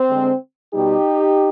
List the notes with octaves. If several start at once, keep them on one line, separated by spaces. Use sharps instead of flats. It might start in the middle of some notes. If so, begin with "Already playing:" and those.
Already playing: C4
D3 G#3
B2 G3 D#4 G4